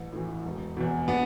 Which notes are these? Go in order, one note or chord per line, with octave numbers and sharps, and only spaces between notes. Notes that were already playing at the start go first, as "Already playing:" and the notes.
Already playing: A1
A2 E3
E1
E2 B2
B3 D4